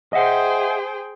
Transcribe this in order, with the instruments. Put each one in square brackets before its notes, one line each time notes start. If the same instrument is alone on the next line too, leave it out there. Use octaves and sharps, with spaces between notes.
[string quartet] G#4 C5 G5 [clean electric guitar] D#5 E5 F#5